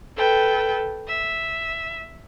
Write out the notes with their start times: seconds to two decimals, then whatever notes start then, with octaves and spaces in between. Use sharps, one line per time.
0.15 A4 B4 G5
1.08 E5